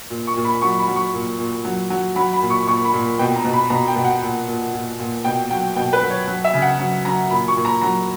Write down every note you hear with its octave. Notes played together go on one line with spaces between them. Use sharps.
A#2
C#6
A#2
B5
F#3 C#6
B5
F#3
C#6
A#2
A#2
F#3
F#3
F#3 B5
B5
A#2
C#6
A#2 C#6
B5
A#2
B2 G5
A#5
B2
B5
B2 A#5
G5
B2
F#5
A#2
A#2
A#2
A#2
B2 G5
F#3 G5
B2 G5
B4
F#3
C#5
F#3
E5
C#3
F#5
F#3
F#3 A#5
A#2 B5
C#6
A#2
A#5
F#3 A#5